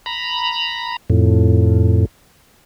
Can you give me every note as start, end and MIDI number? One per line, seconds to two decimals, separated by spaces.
0.06 0.96 82
0.06 0.96 83
1.10 2.06 41
1.10 2.06 45